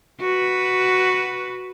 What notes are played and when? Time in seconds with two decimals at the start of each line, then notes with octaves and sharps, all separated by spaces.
0.20 F#4 B4